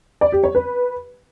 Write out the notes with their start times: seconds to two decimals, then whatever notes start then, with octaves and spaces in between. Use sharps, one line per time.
0.21 D5
0.32 G4
0.44 C#5
0.55 B4